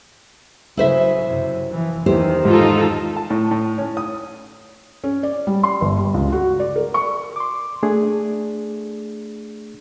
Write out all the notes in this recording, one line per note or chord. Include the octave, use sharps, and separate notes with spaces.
C#3 F#3 E4 C5 E5
F#2 C3
E3 F3
E2 D#3 E3 G4 C5
G#2 D#4 F4 A4
A5
A2
A2
C#4
D#6
C#4
D5
G3
C6
G1
G3
C#2
F#4
D5
A#4
C#6
C6 D6
A3 D4 G#4